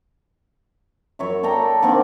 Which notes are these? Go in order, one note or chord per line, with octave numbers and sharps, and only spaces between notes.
F#2 C#5 E5
A4 D5 G5 A#5
D3 D#3 A#3 C4